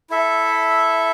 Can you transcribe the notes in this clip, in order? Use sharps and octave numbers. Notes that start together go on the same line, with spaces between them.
E4 A4 E5